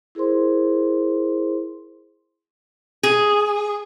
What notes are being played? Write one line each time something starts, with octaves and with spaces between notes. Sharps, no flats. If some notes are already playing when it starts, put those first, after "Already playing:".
E4 G#4 A#4 C5 C6
G#4